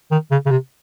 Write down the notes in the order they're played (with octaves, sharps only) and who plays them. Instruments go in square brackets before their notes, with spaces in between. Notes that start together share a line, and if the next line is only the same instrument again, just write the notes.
[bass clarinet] D#3
C#3
C#3
C3